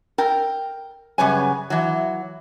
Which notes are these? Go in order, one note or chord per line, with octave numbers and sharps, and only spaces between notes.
A#4 G5
F#2 C#3 G3 B4 C#5 G#5
E3 F#3